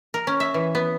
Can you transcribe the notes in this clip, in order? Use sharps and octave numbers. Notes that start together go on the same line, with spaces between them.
A#4
C#4
E5
E3
B3